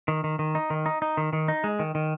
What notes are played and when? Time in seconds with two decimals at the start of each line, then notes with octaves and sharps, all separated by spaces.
0.08 D#3
0.24 D#3
0.39 D#3
0.55 D#4
0.70 D#3
0.86 D#4
1.02 D#4
1.17 D#3
1.33 D#3
1.48 D#4
1.64 G#3
1.79 D#3
1.95 D#3